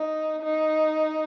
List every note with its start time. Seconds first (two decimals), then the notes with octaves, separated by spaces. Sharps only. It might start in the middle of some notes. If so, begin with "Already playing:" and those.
Already playing: D#4
0.42 D#4